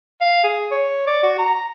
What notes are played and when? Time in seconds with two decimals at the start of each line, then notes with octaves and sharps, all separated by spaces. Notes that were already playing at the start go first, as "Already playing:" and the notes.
0.21 F5
0.44 G#4
0.71 C#5
1.07 D5
1.23 F#4
1.38 A#5